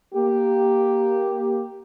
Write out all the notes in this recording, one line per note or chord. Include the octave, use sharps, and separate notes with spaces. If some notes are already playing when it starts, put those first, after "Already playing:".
A#3 G4